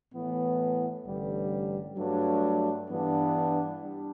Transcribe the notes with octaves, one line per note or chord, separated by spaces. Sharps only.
A2 E3 B3
A1 G2 D3 G3
G2 F#3 A3 D4
G2 E3 B3 D4
G3 D4